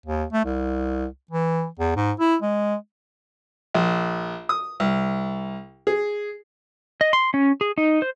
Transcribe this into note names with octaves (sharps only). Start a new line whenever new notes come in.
D#2
A3
C2
E3
E2
G#2
E4
G#3
A#1
D#6
C2
G#4
D#5
C6
C#4
G#4
D#4
C5